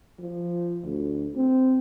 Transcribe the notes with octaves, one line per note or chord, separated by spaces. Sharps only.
F3
D2
C4